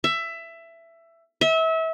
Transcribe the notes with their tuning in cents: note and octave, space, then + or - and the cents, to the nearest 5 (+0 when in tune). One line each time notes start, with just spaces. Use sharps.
E5 +15
E5 -30